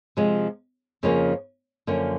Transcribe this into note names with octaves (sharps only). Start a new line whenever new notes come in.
C3 F3 G#3
F2 C#3 F3 A#3 C#4
F#2 D3 F3 A#3 C#4